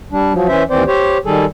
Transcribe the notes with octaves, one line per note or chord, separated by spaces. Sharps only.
G3 D4
F3 F#3
E3 C#4 C5 E5
D#2 E3 C4 C5 D5
G4 C5 C#5
D#3 G3 G#4 A4